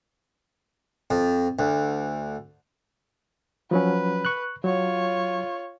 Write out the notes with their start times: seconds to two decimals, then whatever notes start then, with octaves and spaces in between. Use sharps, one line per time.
1.10 F2
1.59 D2
3.71 F3 F#3 C#4 B4
4.25 C#6 F#6
4.64 F#3 F4 C#5